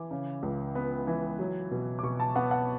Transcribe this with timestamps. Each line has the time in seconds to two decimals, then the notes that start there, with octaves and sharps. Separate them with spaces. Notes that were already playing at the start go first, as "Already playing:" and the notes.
Already playing: E3 D6
0.11 C#3
0.43 C#2
0.75 B3
1.07 E3
1.39 F#3
1.72 B2
1.99 D6
2.03 B2 C#6
2.20 A5
2.35 B3 F#5
2.51 F#5